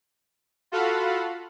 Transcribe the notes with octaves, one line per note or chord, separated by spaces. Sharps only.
F4 F#4 A4 F5 F#5 B5